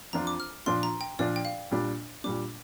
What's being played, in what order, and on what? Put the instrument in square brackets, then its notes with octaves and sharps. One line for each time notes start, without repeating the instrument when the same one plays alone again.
[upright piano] F2 F3 D4 F4 [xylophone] A#5
[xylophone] D6
F6
[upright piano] A#2 F3 D4 F4 [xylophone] C6
[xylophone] A#5
G5
[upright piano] A#2 F3 D4 F4 [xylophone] D5
[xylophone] G5
F5
[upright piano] A#2 G3 D4
[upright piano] A#2 G3 D4 [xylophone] D6